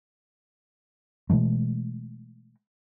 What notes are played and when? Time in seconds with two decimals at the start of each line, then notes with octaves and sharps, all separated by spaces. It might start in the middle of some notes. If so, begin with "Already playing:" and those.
1.30 B2 E3 G#3 A3